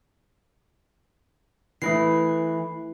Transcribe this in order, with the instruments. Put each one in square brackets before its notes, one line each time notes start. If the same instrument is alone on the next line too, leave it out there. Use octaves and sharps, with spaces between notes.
[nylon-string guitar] E3 [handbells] A3 E4 C7